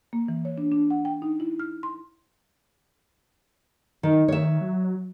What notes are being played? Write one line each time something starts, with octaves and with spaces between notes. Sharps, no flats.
A#3
E3
C#5
D4
D4
F#5
G5
D#4
E4
F6
C6
D#3
D#3 C#5 E5
F#3